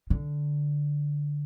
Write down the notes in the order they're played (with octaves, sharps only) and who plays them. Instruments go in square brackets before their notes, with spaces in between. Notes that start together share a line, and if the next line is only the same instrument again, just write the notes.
[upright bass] D3